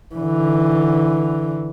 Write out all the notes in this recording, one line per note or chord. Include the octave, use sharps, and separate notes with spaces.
D3 E3